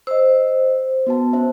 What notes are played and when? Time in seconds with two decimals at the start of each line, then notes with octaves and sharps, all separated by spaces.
0.07 C5 D#5 E6
1.07 B3 F#4 A5
1.33 C#4 C5 E5